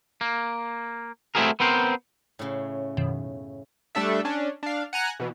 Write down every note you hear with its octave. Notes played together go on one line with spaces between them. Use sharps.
A#3
A3 C4 E4 F#4 G#4 A#4
B3 C4 A#4 C5
A2 C#3
F#2 B2 D#3
G3 A3 D4 A4 E5
C#4 D4
D4 F5
F#5 G#5 A#5 F#6
B2 E3